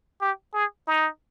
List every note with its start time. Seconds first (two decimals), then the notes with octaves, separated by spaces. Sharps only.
0.21 G4
0.54 G#4
0.88 D#4